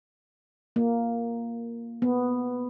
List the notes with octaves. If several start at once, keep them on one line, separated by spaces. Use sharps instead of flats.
A#3
B3